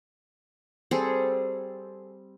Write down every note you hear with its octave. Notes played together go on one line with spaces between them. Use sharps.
G3 C4 G#4 A4